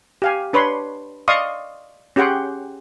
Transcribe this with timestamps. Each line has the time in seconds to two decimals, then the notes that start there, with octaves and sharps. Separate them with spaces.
0.22 G4 F5 G#5
0.53 D4 B4 C#5 B5 C6
1.28 D5 D#5 F5 C6 C#6 D#6
2.16 C#4 G4 G#4 F#5 G5 C6